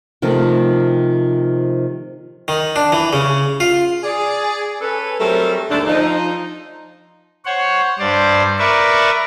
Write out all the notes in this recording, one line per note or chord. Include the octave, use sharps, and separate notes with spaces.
C3 D#3 F3 A3 C4
D#3
D4
E3
C#3
F4
G#4 D5
C#4 A4 B4
F#3 G3 A3 C4 A4 A#4
D#2 G#2 D3 A3 D4 A4
F3 D#4
C5 C#5 F#5
G2 C5 D5
A#4 B4 D5 E5 C#6